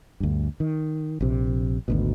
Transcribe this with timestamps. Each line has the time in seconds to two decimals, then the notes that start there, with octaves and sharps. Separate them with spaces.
0.20 D2 G2
0.60 D#3
1.21 A#1 C3
1.88 G#1 D2 B2